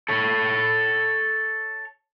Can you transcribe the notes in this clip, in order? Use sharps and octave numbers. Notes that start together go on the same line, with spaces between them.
A4 C#5